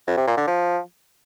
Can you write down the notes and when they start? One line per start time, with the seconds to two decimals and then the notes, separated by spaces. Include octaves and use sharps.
0.08 F2
0.17 C3
0.27 A#2
0.37 D3
0.47 F3